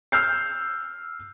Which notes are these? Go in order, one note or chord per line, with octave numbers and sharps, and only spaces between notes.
E6 F6 G6 C7